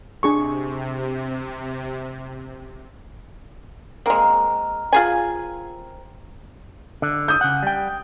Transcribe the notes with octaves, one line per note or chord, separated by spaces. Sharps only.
C3 D4 G#4 C#6
G#3 A#3 C4 A#4
F4 G#4 G#5
D3
D#6 G6
C#3 F#5
G3 G5